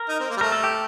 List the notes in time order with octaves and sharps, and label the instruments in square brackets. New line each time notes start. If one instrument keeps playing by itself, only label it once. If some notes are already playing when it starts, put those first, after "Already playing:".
Already playing: [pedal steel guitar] A#4
[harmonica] D#4
C4
A#3
G3
[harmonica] A3 [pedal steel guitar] A#4
[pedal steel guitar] A4
G4